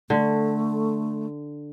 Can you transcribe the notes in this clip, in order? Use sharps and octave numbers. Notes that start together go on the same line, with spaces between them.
D3 A3